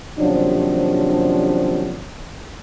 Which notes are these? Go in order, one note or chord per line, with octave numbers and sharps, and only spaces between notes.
D#2 C3 F3 F#3 C#4 D4